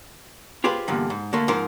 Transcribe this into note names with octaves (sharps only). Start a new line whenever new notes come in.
F4 G4 G#4 B4 C5
E2 G2 A#2 D3
G#2
D3 A3 A#3
G#2 F3 A#4